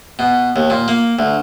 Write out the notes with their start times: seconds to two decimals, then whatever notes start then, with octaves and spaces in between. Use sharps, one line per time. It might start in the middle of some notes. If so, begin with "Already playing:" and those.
0.19 B2
0.56 D#2
0.70 A#2
0.88 A#3
1.19 D2